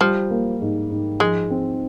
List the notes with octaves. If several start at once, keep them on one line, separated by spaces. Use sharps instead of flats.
F3 G3
A#3
G#2
G#2
F3 G#3
C4